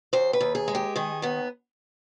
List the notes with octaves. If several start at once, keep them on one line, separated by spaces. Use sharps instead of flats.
D#2 C5
B4
D#2
G#4
G#3
G4
D#3 G#4
D#2 B3